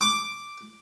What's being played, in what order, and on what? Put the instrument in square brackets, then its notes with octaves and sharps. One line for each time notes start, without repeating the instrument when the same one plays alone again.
[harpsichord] D6